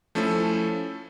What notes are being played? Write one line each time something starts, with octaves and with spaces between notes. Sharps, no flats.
F3 A3 C#4 E4 A4